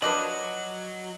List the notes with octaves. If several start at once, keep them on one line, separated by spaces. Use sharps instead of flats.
F3 F#3 D4 B4 D#5 D6 F#7